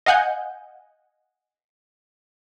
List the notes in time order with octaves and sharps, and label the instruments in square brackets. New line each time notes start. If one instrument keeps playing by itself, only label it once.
[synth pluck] D#5 F5 F#5 G#5 G6